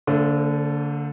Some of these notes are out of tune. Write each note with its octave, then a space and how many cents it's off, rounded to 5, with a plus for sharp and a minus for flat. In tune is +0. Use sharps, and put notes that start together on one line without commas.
D3 -20 A3 +40 C5 +0